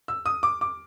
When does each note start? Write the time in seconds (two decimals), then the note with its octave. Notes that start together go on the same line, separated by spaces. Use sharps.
0.08 E6
0.26 D#6
0.43 D6
0.61 D6